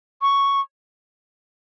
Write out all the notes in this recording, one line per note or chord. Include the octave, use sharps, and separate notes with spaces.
C#6